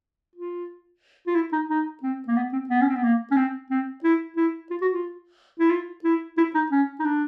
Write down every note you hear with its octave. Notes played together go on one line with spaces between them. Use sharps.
F4
F4
E4
D#4
D#4
C4
A#3
B3
C4
B3
C#4
C4
B3
A#3
C#4
C4
C4
E4
E4
F4
F#4
F4
E4
F4
E4
E4
D#4
C#4
D#4
D4